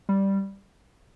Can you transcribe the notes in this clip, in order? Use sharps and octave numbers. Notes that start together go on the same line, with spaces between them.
G3